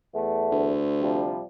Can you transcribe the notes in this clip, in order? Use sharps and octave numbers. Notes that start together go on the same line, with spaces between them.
E2 A3
D2
C3 F3 G3